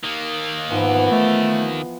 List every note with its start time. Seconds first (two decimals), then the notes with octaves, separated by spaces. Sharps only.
0.04 D#3 A#3
0.70 G#2 E3 F3 B3
1.11 A3